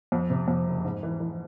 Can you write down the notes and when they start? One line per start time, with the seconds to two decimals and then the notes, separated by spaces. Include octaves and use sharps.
0.12 F2
0.30 C3
0.48 F2
0.66 F#1
0.85 G#2
1.03 E3
1.20 E3